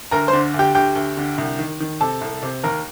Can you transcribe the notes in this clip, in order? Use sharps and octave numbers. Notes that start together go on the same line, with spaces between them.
D2 A#4 A#5
C5 C6
D3
D2
G4 G5
D2 G4 G5
D2
D3
C2
D#3
D#3
C3 A4 A5
C2
C3
D#2 A#4 A#5